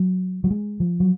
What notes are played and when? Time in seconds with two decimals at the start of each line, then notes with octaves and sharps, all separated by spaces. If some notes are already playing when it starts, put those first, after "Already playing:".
Already playing: F#3
0.44 F#3
0.50 G#3
0.80 F3
1.00 F#3